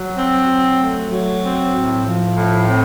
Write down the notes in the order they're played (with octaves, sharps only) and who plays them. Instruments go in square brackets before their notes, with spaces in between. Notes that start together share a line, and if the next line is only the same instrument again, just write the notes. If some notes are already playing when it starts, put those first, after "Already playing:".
Already playing: [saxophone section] F#3
C4
F#3
A3
F#3
C4
A2
F3
A2
C4